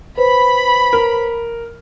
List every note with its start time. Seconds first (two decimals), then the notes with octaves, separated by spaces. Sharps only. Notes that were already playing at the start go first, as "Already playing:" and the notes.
0.18 B4 C5 B5
0.93 A#4